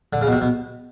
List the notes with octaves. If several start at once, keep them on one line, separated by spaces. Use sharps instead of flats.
D3
C#3
B2
C3
B2